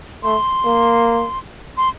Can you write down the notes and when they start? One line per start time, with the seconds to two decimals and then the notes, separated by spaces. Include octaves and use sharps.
0.23 A3 C6
0.65 A#3
1.77 C6